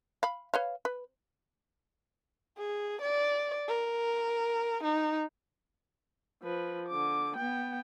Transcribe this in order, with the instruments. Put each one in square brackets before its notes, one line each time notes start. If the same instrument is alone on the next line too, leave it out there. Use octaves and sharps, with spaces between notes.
[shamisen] F5 B5
B4 C#5 F5
B4
[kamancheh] G#4
D5
A#4
D#4
[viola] F3 B4
D3 D6
B3 G5